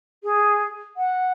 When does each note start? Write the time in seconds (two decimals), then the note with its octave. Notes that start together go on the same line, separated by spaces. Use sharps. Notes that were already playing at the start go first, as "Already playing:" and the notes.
0.23 G#4
0.96 F#5